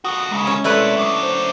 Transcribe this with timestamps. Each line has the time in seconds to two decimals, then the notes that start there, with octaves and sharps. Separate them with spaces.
0.05 F2 F#4 D#6
0.31 C2 C#3 G#3
0.47 C#4
0.64 A3 C4 E4 B4 D5
0.97 F#3 D4
1.22 C5